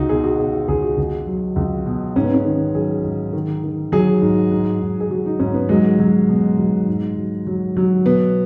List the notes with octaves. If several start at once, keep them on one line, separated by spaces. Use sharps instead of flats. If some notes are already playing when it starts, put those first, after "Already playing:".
Already playing: C#2 D#4 F#4
B2 G#4
F#4
B2 G#4
F#4
C#2 G#4
F#4
C#2
F#3
C#2
B2
G#2 C#4
B3
C#4
D#3
F#3 G#4
G#2
D#3
D#3
F#3 G#4
G#2
G#2
G#2
G#4
F#3 F#4
D#4
G#2 C#4
B3
F#3 G#3
F#3
B2
F#3
G#2
F#3
F#3
F#3
B2 B3